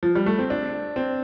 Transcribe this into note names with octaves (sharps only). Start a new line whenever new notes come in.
F3
G3
A3
C4
D4
C4